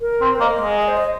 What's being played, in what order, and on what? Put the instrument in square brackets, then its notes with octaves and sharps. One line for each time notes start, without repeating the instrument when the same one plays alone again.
[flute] A#4
[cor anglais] C4
[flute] C5
[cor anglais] A#3 [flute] D#5
[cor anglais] G#3
[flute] D#5
C5
D#5